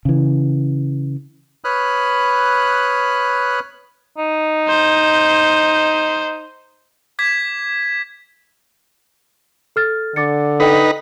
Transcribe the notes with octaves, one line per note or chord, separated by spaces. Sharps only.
C#3 E3
B4 C#5 B5 D#6 F6 F#6
D#4
C5
D6 G#6 B6
A4 F6 A6
D3 D6 A6 C#7
D#4 A4 B4 D#5 G5